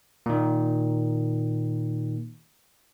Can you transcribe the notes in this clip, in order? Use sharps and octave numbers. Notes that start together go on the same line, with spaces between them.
A#2 D#3